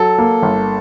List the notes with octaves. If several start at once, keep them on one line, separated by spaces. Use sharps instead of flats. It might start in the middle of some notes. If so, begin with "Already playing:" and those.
Already playing: F#3 A4
A#3
G1